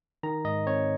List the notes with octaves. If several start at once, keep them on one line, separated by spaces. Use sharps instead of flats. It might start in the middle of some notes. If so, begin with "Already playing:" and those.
D#3 A#5
G#2 D#5
C4 C#5